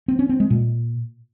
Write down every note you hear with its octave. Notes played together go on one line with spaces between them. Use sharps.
C4
C#4
C4
G#3
A#2